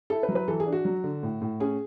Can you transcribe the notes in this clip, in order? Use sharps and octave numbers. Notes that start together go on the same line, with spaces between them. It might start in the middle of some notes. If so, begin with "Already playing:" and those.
E4 A4
B4
F#3
B4
E3 A4
G#4
D4
F#4
F#3
D3
A2
A2
C#4 G#4